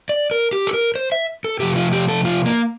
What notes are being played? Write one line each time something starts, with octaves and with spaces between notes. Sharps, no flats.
D5
A#4
G4
A4
A#4
C5
E5
A4
C3 F3 A3 G4
F4
G4
A4
F4
A#3